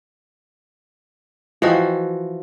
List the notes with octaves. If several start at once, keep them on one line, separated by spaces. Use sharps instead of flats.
E3 F3 F4 F#4 D#5 G5